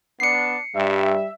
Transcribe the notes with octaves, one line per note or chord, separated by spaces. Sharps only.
B3 D4 C7 C#7
G2 G3 E5